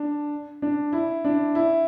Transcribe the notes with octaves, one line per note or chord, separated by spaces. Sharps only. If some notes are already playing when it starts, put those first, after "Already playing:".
Already playing: D4
D4
E4
D4
E4